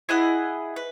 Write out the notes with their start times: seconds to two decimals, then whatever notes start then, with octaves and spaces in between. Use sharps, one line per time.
0.09 E4 G#4 D#5 F#5
0.76 B4